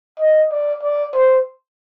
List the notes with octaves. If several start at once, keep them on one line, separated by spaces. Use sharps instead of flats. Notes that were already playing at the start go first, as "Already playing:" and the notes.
D#5
D5
D5
C5